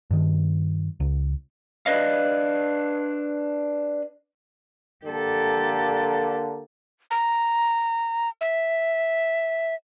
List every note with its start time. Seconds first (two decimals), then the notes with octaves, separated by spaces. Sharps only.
0.11 G2 D#3
1.00 C#2
1.86 D4 B4 D#5 F5
5.05 D3 A#3 G4 A4
7.11 A#5
8.41 E5